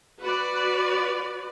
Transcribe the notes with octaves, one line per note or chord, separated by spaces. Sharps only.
F#4 B4 D5